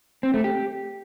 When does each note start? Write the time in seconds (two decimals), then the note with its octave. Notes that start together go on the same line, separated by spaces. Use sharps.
0.23 C4
0.34 A3
0.44 G4